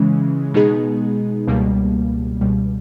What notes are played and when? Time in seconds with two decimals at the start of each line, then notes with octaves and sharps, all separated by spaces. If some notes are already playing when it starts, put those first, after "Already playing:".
Already playing: C#3 E3 G#3 C#4
0.54 B2 G#3 B3 D#4 G#4
1.47 C#2 B2 G3 A#3
2.41 C#2 B2 G3